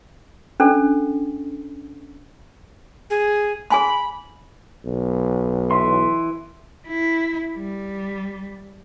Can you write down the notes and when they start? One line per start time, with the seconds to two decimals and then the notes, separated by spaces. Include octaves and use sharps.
0.60 C#4 D4 A4
3.10 G#4
3.70 G#4 G#5 B5 C6
4.86 B1
5.71 E3 E5 C6
6.86 E4
7.57 G3